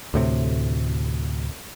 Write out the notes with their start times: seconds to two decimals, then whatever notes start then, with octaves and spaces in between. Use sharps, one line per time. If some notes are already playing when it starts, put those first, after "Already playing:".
0.14 D2 A2 C3